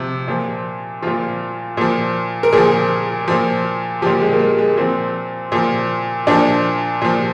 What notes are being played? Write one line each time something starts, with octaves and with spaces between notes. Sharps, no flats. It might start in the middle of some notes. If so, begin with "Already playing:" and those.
Already playing: C3 F3
A#2 F3
A#2 F3 F4
A#2 F3
A#4
A#2 F3 G#4
A#2 F3
A#2 F3 G4
G#3
A#3
G#3
G#3
A#2 F3 C4
A#2 F3
A#2 F3 D4
A#2 F3